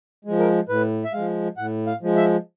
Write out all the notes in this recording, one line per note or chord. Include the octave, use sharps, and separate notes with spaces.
F3 G#3
A#4
A2 B4
E5
F3 G#3 F5
A2 F#5
F5
F3 G#3
E5